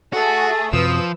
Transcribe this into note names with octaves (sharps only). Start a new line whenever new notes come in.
A3 F#4 G#4 A4
F#2 C3 F3 F#3 B4 D#6 E6